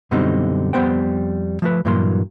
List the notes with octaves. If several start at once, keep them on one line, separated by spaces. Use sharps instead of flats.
F#2 B2 D3 G3 C4 D#4
F2 G3 B3 C5 G5
F3 A3 B4
G2 A#2 E3 F#3 A#3 C6